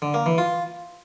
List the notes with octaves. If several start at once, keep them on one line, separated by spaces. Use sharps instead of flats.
D3
A#3
E3
F4